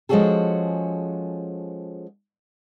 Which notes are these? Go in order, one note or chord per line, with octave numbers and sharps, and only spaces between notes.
F3 G#3 C#4 F#4 G#4 A4